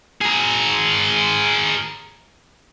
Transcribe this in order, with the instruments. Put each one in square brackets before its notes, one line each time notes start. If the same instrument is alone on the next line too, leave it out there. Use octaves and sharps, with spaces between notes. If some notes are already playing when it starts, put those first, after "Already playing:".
[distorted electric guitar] G#4 A#4